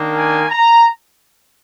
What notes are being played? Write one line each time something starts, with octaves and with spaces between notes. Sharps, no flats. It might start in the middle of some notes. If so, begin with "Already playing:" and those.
Already playing: D#3 A#3 D4
G#5
A#5